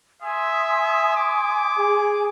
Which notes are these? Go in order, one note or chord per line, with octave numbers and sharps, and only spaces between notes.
E5 G#5 C6 D#6
D6
G#4